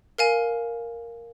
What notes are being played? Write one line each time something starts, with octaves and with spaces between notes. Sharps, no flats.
A#4 F5 G#5